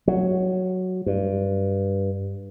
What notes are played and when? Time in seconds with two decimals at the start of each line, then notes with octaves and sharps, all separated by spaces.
0.08 F#3
1.06 G2